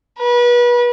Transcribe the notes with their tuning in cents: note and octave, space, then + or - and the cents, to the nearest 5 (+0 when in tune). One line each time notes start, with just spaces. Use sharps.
B4 -35